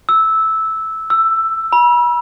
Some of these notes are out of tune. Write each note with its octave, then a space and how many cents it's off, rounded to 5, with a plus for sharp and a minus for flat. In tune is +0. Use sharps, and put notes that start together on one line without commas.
E6 -10
E6 +10
B5 -40